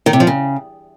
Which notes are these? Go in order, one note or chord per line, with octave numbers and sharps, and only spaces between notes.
D#3
C3
F3
C#3